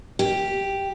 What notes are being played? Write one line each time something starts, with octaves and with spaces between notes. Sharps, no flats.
G4